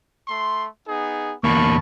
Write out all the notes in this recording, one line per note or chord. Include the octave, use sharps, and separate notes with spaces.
A3 C6
B3 D#4 G#4
E2 A#3 A5 B5 C#6